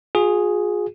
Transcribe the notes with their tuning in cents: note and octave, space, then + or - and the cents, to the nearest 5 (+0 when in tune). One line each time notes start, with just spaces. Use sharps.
F4 +45 G#4 +0